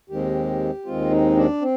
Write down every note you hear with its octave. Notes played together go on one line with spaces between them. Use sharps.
D#2 D#3 G#3 C4 G4
D#2 D#3 G#3 C4 F4
D#4
D4
C4